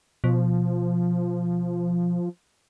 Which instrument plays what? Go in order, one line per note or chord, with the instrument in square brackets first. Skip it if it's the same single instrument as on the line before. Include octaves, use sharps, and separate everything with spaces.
[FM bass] B2 [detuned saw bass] F3